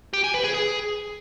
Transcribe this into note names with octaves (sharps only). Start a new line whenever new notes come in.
G4
G#5
B4
G#4
G#4